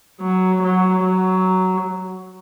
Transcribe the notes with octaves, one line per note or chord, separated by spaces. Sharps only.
F#3
F#3
F#3